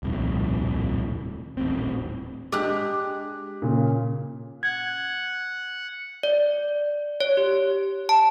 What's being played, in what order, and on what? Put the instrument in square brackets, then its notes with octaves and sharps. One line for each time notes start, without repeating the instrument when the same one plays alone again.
[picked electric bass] D#1 C2 F2 A2
D#1 A1 C4
[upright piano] G#3 D4 [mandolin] G4 F#6
[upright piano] A#2 C#3
[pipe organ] F#5 [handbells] G#6
[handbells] D5
C#5
G4
A5